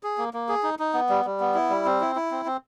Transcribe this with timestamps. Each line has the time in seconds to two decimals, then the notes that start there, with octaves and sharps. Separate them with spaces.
0.03 G#4
0.18 A#3
0.34 A#3
0.49 G#4
0.63 D#4
0.79 D#4
0.94 B3
1.09 G3
1.25 G3
1.40 B3
1.54 E4
1.70 G3
1.85 C4
2.01 E4
2.16 E4
2.31 C4
2.45 C4